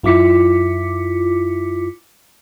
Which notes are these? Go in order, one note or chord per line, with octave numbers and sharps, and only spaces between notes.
F#2 E4 F4 D6 B6 C#7